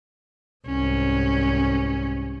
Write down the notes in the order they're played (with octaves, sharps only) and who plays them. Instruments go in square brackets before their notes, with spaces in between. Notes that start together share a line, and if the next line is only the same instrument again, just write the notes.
[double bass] C2 G#2 [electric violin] C#4